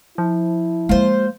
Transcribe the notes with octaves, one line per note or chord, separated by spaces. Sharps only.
F3 E4
G#3 A#3 F4 C5